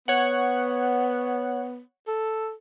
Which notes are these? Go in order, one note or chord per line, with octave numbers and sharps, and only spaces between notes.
B3 C#5 F#5
A4